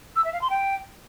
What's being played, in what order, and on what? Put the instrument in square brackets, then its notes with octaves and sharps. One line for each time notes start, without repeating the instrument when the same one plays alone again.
[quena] E6
E5
F5
C6
G5